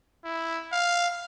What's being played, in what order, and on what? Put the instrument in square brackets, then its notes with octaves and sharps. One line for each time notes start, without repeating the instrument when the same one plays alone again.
[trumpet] E4
F5